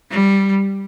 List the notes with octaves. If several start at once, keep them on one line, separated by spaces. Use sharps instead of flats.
G3